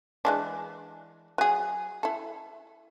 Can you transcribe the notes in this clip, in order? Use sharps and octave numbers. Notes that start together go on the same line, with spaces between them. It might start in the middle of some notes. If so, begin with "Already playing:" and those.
E3 G#3 D4
F#3 G#4
E4 A4